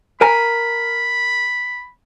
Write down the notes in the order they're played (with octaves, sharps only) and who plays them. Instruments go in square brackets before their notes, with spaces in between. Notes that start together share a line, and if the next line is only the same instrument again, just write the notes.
[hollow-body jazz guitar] A#4 G#5 A#5 [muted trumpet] B5